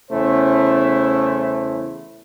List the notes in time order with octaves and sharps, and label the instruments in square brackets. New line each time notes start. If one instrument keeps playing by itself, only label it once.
[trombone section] E2 C#3 A3 C#4 E4 C5